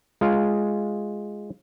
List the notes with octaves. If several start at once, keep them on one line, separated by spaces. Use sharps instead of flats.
G#3 F4 F5